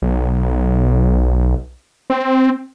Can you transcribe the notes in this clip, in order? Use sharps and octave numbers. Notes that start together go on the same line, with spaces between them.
B1
C4